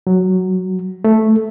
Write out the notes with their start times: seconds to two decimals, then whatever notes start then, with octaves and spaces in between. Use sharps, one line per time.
0.07 F#3
1.04 A3